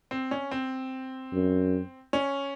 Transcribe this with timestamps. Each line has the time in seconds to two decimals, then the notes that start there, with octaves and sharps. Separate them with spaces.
0.11 C4
0.31 C#4
0.51 C4
1.33 F#2
2.13 C#4